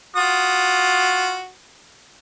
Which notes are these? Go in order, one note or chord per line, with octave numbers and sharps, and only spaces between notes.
F4 F#4 D#6